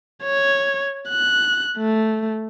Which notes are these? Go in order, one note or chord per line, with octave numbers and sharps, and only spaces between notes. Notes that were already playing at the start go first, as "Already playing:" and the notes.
C#5
F#6
A3